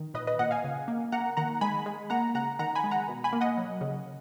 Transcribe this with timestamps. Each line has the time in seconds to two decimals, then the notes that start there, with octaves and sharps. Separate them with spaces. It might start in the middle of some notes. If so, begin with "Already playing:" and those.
Already playing: D#3
0.14 A#2 B4 D#5
0.27 B4 D#5
0.39 A#2 D#5 F#5
0.51 F5 G#5
0.64 C#3
0.88 A#3
1.12 A#3 F#5 A#5
1.37 D#3 F#5 A#5
1.61 G#3 G#5 B5
1.86 G#3
2.10 A#3 F#5 A#5
2.35 C#3 F#5 A#5
2.59 D#3 F#5 A#5
2.75 G#5 B5
2.84 G#3
2.91 F#5 A#5
3.08 B2
3.24 G#5 B5
3.33 A#3
3.41 D#5 F#5
3.57 F#3
3.81 C#3